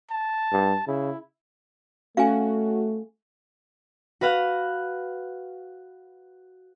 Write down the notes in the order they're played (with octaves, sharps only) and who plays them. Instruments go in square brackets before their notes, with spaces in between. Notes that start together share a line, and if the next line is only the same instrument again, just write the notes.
[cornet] A5
[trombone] G2
[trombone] C#3 [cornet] E4
[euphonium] A3 [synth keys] C#4 F#4 [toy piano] F5 G#5
[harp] F#4 B4 F5 F#5